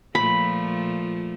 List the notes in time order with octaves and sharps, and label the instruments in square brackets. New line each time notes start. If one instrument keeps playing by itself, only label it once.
[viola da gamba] A#2 F3 A3 [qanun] B5